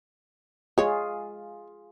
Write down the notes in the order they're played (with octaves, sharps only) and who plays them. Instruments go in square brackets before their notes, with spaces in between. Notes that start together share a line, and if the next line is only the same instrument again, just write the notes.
[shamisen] G#3 C#5 [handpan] F4 G#4